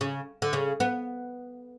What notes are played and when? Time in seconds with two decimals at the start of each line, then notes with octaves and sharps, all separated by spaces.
0.01 C#3
0.42 D3
0.53 C#3
0.80 B3